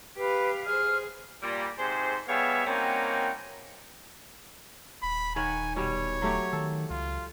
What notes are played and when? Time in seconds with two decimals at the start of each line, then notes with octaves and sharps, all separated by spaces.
0.17 G4 B4 F5
0.66 G#4 C5 F6
1.42 A#2 G3
1.79 G#2 C3 G#4 C5
2.28 G3 B3 G#4 C#5 E5 F5
2.65 G3 A#3 C4 C#4 D#4 F#4
5.03 D#1 B5
5.36 D#3 C#5 F#5 G#5
5.76 B2 G3 C#5
6.22 F#3 A3 G4
6.53 D#3 A4
6.90 C#2 F4